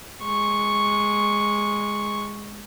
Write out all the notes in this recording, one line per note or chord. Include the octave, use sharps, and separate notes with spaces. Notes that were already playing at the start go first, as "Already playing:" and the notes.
G#3 C#6